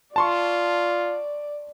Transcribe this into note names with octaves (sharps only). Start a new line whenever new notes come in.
F4 D5 A5 C6 C#6